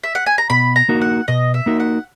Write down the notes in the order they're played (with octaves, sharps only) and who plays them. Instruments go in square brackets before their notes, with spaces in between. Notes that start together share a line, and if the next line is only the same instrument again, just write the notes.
[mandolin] E5
F#5
G#5
A#5
[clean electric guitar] B2 [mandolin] B5
[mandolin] A#5
[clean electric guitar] A#3 D#4 F#4 A#4
[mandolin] F#5
[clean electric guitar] B2 [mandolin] D#5
[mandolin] E5
[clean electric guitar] A#3 D#4 F#4 A#4
[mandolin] F#5